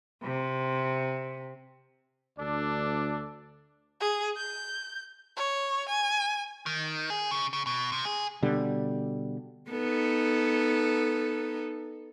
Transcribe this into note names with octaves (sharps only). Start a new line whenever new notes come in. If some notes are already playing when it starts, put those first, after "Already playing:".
C3
D2 D4 A4 D5
G#4
G6
C#5
G#5
D#3
G#4
C#3
C#3
B2
C3
G#4
B2 D3 G3
B3 D#4 A4